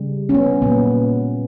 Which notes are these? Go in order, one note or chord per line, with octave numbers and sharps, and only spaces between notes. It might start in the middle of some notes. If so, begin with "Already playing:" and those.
Already playing: C#3 G3
C#4
B3
A#2 F#3 A#3 B3